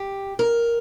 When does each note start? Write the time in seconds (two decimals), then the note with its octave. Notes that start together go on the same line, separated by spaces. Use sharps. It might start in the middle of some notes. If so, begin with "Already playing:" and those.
Already playing: G4
0.39 A#4